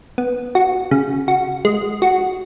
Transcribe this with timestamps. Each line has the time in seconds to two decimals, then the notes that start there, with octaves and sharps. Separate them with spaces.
0.18 B3
0.55 F#4
0.91 C#3
1.28 F#4
1.65 G#3
2.02 F#4